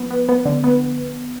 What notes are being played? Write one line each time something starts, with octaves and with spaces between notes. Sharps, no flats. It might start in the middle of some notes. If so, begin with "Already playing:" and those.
Already playing: F3 B3
B3
B3
D3
B3